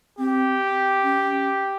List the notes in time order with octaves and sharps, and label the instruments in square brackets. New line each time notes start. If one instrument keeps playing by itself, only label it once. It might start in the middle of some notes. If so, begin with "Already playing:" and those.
[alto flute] C4 [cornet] G4
[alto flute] C#4